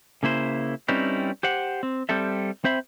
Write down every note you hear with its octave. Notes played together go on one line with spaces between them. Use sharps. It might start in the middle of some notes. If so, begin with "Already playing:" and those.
C#3 A#3 E4 C5
G3 C4 C#4 D#4 E4 B4
G4 C5 F#5
C4
G3 C4 A4 E5
C4 C5 E5 B5